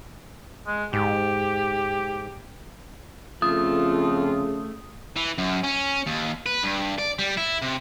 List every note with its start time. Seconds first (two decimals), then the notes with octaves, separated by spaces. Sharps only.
0.67 G#3
0.93 G#2 G4
3.42 F2 C#3 A3 F4 D#6
5.16 E3
5.38 F#2
5.64 C#4
6.06 D#2
6.46 B4
6.64 G2
6.99 D5
7.19 G3
7.37 E4
7.62 C3